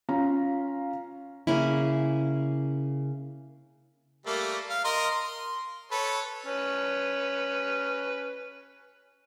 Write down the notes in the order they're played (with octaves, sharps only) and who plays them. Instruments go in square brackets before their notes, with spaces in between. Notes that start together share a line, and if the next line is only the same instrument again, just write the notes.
[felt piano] C#4 F4 F5 A#5
[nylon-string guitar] C#3 A#3 C#4 E4
[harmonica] G3 A3 A#3
F5
A#4 D#5 C6
C6
A4 B4 C#5
C#4 B4